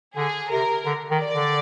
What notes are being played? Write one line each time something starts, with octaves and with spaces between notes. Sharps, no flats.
D3 G#4
C3 A#4
D3
D#3
D5
D3